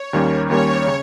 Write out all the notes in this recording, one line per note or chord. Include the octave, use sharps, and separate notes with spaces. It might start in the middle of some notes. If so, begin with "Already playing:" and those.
Already playing: C#5
D#2 D#3 G3 A#3 C#4
D#2 D#3 G3 A#3 C#4 C#5
C#3